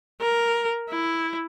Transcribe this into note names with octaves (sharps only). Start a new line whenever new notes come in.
A#4
E4